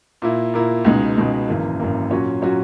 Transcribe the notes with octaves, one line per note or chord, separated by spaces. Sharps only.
A#2 A#3 E4
A#2 A#3 E4
C#2 B2 G#3 D#4
C#2 B2 G#3 D#4
G#1 F#2 E3 A#3
G#1 F#2 E3 A#3
A#2 F#3 C#4 F#4
A#2 F#3 C#4 F#4